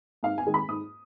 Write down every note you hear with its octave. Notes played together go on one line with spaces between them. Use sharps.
G#2 F5
G#5
D#3 G#3
B5
G#2 D#6